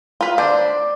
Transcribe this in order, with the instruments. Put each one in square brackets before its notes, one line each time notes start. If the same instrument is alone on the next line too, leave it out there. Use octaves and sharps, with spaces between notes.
[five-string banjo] F4 B4
[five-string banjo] D4 C5 [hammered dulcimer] D5